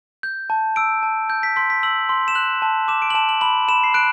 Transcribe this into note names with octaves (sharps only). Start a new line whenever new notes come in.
G6
A5
E6 D7
A5
G6
B6
C6 B6
B6
E6 F#7
C6
E7
F#6 F#7
A5
D6 E7
D7
F#7
A5 E7
F#7
B5 F#7
B5 E7
C7
F#6 D7